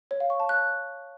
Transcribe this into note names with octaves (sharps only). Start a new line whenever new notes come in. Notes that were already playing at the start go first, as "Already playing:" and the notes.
C#5
F5
C#6
A5
F#6